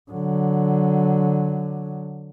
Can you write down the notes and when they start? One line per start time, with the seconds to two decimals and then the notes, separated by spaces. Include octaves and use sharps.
0.11 D3 F#3